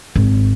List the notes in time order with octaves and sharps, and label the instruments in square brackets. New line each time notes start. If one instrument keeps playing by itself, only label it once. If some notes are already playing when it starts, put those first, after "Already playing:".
[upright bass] G#1